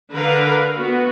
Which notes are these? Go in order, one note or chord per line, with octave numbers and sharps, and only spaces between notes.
D3 A#4 B4 F5
B3 F#4